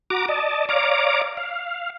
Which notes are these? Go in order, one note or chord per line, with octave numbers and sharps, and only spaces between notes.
F#4 A#5 D6
D5 D#5 A5
C#5 D5 F5 A#5 D6
F5